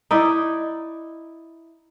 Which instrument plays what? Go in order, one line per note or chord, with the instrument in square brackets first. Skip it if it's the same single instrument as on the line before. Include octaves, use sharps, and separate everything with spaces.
[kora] D#4 E4 D5